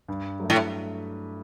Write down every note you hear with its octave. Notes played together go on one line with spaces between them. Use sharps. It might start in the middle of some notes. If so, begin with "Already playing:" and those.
G2
F#3 A3
A2